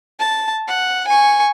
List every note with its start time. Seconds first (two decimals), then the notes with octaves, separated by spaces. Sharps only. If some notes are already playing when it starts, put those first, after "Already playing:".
0.19 A5
0.67 F#5
1.08 G#5 C#6